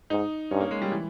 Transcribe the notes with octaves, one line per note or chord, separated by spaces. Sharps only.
G#2 D#4
G2 C#4
A#3
G#3
G3
E3